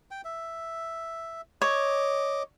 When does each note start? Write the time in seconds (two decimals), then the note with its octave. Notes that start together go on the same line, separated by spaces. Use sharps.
0.11 G5
0.24 E5
1.62 C#5 D#5 D6